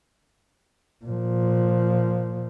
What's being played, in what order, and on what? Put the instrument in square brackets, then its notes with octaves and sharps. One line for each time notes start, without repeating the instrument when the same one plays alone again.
[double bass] A#2 F3